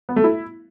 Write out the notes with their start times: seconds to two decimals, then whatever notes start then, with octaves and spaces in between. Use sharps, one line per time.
0.09 B3
0.16 A3
0.24 E4